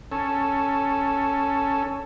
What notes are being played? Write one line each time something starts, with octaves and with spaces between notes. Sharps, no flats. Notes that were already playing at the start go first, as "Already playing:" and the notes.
C#4 A4